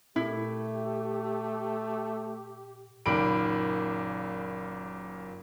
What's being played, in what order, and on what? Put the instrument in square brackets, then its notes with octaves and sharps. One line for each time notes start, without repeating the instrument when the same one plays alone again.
[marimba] A#2 [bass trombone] A3 [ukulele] E4 [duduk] G4
[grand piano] F#1 A#2 D#3 B5 D7